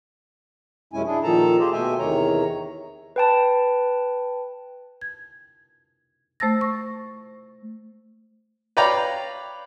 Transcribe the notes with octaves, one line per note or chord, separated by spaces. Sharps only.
F#2 C3 G#3 C#4 E4 G#5
D4 E4 G#4
A#2 D#3 F3 A4 A5 A#5
F4 G4 G#4 C5 D#5
B2 A3 E5 G5 G#5
E2 C3 D#3 C#5 A#5
B4 G5 A5
G#6
A3 C5 A5 E6 A6 A#6
C#6
B4 C#5 D5 F5 G5 A#5